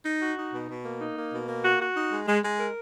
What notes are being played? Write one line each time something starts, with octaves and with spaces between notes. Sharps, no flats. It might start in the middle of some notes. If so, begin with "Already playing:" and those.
D#4
F#4
D#4
B2
B2
A#3
D#4
A#3
B2
A#3
F#4
F#4
D#4
G#3
G#3
G#3
A#4